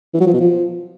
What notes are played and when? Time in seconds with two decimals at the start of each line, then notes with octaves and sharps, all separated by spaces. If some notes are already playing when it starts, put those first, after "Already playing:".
0.14 E3
0.20 F#3
0.27 F3
0.34 B2
0.40 F3